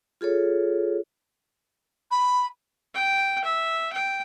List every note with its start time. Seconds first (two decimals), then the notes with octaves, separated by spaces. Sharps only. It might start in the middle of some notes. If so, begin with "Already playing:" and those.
0.21 F4 G#4 A4 C#5
2.11 B5
2.94 G5
3.44 E5
3.92 G5